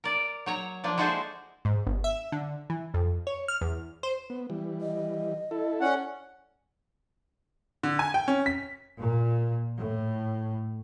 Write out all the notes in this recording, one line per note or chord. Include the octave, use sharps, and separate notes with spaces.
A#4 D5
F#3 C#5 A#5
F3 A#3 D4
G#3 E4 F#4 G#4 A4 C5
G#2
G1
E5
D3
E3
F2
C#5
F6
E2
C5
B3
E3 G3
D#5
E4 A4
C#4 D5 F#5
D3
G#5
G5
C#4
B6
A#2
A2